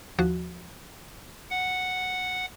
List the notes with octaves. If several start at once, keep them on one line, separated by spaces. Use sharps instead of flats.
D#2 F3 F#4
F#5